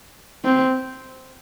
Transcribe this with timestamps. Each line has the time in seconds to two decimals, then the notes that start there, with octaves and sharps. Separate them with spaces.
0.45 C4